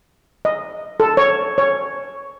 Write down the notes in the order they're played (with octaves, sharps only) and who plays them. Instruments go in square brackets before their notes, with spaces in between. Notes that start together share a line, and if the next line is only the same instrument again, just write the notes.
[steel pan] D#5
A4
C#5
C#5